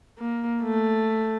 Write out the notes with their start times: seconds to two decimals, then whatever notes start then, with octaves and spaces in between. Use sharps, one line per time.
0.19 A#3
0.62 A3